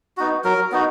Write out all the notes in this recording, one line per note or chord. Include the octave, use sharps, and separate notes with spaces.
B3 D#4 F#4
F#3 A#4
B3 D#4 F#4